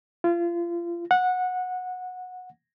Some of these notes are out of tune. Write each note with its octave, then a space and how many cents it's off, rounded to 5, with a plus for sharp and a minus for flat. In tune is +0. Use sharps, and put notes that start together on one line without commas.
F4 -30
F#5 -15